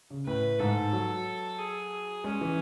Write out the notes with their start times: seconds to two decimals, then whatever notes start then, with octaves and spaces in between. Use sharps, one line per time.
0.10 C#3
0.26 A2 B4
0.59 G#2 A4
0.93 F#3
1.59 G#4
2.24 G#3 C#4
2.41 E3